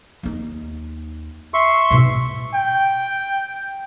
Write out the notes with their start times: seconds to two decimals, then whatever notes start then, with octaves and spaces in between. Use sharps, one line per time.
0.23 D#2 D#4
1.54 E5 C6 C#6
1.91 G#2 B2
2.54 G5